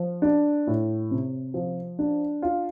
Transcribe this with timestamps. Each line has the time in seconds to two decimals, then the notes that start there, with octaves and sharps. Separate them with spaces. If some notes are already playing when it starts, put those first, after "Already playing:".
Already playing: F3
0.22 D4
0.67 A2
1.11 C3
1.54 F3
1.99 D4
2.42 F4